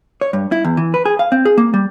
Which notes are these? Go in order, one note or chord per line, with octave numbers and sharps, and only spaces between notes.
C#5
G2
E4
E2
E3
B4
G#4
F5
C4
G#4
A#3
G3